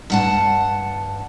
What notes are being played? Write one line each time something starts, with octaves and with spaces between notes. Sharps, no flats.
G2 F#5 A5